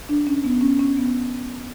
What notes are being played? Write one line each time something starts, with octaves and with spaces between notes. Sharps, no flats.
D4
C#4
B3
C#4
C#4
B3